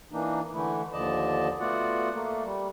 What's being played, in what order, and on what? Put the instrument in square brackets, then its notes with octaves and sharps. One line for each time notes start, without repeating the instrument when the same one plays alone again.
[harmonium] E3 A#3 D4 D#4
D3 E3 A3 E4
D#2 D3 F3 D5 D#5 A5
A3 B3 F4 F#4 D5 F#5
A3 A#3
G3